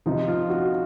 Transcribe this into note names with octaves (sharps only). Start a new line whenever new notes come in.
C3 F3 D#4
F4
F#4